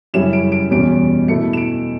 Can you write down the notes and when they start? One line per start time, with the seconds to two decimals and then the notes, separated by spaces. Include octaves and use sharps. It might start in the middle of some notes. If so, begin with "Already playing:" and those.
0.14 F#2 C#3 G3 C#4 E4 E7
0.33 D7
0.52 D7
0.71 E2 B2 G3 C#4 D7
1.28 B2 A3 E4 C#7
1.53 E7
1.57 D7